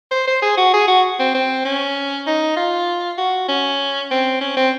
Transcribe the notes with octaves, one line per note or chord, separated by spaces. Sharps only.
C5
C5
G#4
F#4
G#4
F#4
C4
C4
C#4
D#4
F4
F#4
C#4
C4
C#4
C4